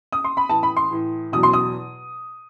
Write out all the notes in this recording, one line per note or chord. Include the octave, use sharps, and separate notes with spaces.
D#6
C6
B5
A2 E3 A5
B5
C6
A2 E3
E2 B2 F#3 D#6
C6
D#6